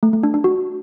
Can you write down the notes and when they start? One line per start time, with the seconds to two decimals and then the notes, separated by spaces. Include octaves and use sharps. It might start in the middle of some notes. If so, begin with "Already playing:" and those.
0.03 A3
0.13 A3
0.23 D4
0.34 D4
0.44 F#4